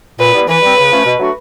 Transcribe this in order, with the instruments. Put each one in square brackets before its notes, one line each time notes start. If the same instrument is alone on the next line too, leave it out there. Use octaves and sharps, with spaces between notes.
[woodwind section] A#2 [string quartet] B4
[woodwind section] G3 B3 E4
[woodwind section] E3 [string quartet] B4
[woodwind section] G3 C4
C#3
F3 A3 C#4
B2
F#3 A3 D4 F#4